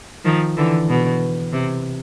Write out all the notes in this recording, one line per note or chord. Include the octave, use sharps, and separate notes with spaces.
D#3 F3
D3 E3
B2
C3